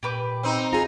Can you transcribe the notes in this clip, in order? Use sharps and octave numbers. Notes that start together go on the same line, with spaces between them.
A#2 G4 B4 D6
C4 D#4
F4 G#4 A#5